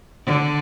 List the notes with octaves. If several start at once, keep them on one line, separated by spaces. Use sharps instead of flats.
D3